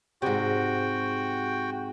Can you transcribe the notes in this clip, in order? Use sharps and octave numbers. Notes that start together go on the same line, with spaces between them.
G#2 C3 F#4 G5